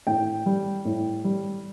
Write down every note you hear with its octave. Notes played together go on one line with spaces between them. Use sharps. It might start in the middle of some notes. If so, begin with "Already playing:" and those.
A2 G5
G3
A2
G3